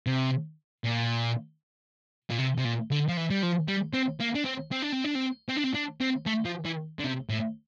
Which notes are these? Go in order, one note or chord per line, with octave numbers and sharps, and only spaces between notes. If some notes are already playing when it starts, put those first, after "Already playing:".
C3
A#2
A#2
C3
C3
A#2
D3
F3
E3
G3
F3
G3
C4
A#3
D4
C4
C4
D4
C4
D4
C4
C4
D4
C4
D4
C4
A3
F3
E3
D3
C3
A2